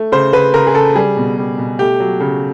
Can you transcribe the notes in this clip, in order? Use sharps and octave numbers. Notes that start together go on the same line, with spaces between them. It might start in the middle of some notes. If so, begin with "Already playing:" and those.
Already playing: A3
C#3 C5
C#3 B4
C#3 A#4
G#4
C#3 A4
G3 G#4
B2
G3
B2
A3 G4
F#3
C#3